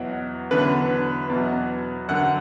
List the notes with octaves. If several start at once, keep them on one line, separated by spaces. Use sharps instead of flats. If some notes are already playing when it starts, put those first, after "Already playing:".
Already playing: E2 B2 F#3
E2 D3 F#3 B4
E2 B2 F#3
F#2 D3 F#3 F#5